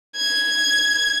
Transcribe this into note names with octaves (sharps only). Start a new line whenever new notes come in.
G#6